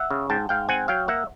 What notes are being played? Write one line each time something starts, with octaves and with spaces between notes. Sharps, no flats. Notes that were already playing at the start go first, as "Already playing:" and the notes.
Already playing: E5 F#5
C#3
G#2 G5 A5
G#2 F5 G5
C4 F#5 G#5
F#3 F5 G5
A#3 E5 F#5